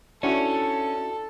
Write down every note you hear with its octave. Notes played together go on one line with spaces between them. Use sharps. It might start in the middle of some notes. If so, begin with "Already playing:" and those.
C#4 D4 E4 F#4 A4